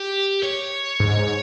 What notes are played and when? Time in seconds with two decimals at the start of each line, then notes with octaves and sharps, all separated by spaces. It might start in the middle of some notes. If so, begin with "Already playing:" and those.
Already playing: G4
0.43 C#5
1.00 G#2